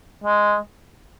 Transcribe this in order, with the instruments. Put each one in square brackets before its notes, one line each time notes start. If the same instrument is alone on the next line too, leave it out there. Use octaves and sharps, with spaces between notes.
[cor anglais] G#3